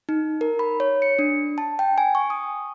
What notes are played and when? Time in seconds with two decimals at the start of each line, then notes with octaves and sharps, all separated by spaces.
0.09 D#4
0.41 A#4
0.59 B5
0.80 C#5
1.02 C#7
1.19 D4
1.58 A5
1.79 G5
1.98 G#5
2.15 C#6
2.30 D#6